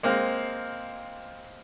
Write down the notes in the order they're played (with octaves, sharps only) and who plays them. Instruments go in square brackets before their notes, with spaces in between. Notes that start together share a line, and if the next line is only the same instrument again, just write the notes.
[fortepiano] G#3 A#3 C4 F5